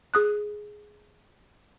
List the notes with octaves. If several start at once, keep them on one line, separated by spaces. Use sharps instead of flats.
G#4 D#6 F#6